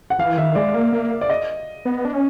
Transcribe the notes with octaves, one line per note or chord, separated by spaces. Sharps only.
F#5
E3 F5
D#3 E5
G#3 D5
A#3
A#3
D5
D#5
B3
D4
C#4